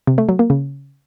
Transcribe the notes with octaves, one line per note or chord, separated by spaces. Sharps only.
C3
A3
F#3
A#3
C#3